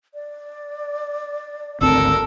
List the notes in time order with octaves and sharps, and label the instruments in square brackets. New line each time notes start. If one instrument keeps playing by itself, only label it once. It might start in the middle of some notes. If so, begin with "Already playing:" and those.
[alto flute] D5
[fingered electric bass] G#1 D2 C4 [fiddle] A4 A#4 [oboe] E6